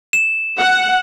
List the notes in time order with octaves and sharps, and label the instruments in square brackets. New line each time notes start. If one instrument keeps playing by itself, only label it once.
[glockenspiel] E7
[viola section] F#5